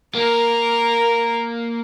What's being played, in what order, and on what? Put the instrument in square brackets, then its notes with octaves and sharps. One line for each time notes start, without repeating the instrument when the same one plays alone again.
[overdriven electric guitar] A#3 [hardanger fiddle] A#4